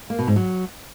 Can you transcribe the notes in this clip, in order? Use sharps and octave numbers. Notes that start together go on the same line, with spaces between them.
A#3
B2
G#2
F#3